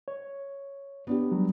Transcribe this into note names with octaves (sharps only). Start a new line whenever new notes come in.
C#5
B3 D4 G4
F#3 G3